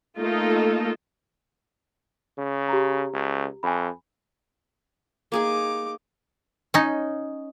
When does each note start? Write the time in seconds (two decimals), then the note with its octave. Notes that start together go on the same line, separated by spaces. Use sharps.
0.18 A3 A#3 D#4 F4 A4 D#5
2.38 C#3
2.69 G4 A#5
3.13 C#2
3.63 F2 G#5 B5
5.32 A#3 D#4 G#4 G#5 D6
6.74 C#4 D#4